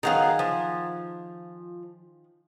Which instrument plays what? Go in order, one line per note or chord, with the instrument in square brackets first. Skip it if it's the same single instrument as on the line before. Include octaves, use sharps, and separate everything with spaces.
[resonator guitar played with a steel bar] D#3 G#4 F5 [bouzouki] F#3 B3 A#4
[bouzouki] F3